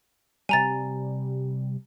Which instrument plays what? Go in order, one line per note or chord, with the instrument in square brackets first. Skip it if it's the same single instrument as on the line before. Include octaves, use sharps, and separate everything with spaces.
[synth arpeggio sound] C3 G3 [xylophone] G#5 A#5 A6